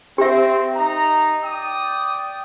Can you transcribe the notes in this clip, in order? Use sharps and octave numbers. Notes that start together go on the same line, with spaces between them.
C4 G4 E5
D#4 A#5
D5 G5 D#6